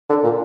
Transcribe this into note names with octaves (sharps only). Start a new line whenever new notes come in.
D3
A#2